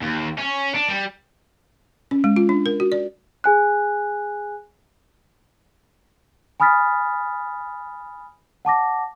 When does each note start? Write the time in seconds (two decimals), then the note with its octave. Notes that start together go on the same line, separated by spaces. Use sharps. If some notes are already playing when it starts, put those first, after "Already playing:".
0.02 D#2
0.38 C#4
0.75 D4
0.89 G3
2.11 C#4
2.24 G#3
2.36 F4
2.49 D4
2.66 A#4
2.80 F#4
2.92 D5
3.44 G#4 G#5 F#6
6.60 G#5 B5 D#6 F6 A6 B6
8.65 F#5 A5 D6 A#6